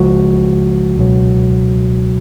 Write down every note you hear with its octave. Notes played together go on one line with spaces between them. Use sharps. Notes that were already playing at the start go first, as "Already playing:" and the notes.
Already playing: C#2 C#3 F3 G#3 F#4
C#2 B2 F#3